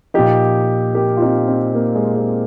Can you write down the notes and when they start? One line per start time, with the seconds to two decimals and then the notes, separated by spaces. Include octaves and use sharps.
0.14 A#2 F3 D#4 G4
0.94 G4 A#4
1.17 F4
1.22 C4 D#4
1.48 C4 D#4
1.75 A#3
1.95 G#3
2.16 G#3